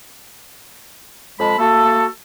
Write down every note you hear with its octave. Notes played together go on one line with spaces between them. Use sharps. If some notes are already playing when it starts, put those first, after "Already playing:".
F2 G#3 A5 B5
A3 A#3 F#4 A4